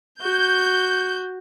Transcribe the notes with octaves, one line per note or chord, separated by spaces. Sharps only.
F#4 G6